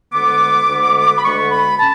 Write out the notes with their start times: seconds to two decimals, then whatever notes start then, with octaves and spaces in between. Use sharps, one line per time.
0.12 D2 D3 G#3 B3 D6
0.68 D2 D3 G#3 B3
1.18 B5
1.23 D2 D3 G#3 B3 C#6
1.51 B5
1.79 C#4 A5